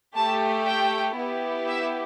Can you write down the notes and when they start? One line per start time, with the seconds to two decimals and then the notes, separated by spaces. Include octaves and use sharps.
0.15 A3 G4 A5
0.66 G5
1.17 B3 E4 G4
1.68 E5